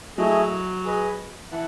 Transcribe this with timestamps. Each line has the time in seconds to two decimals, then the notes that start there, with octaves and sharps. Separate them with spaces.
0.17 F#3 A3 E4 G#4 D#5
0.84 G#4 B4 D#5
1.51 E3 E4 B4 F#5 A5